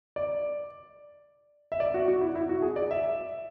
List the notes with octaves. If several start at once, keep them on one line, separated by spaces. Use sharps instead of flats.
D5
E5
D5
F#4
F#4
E4
E4
F#4
G#4
D5
E5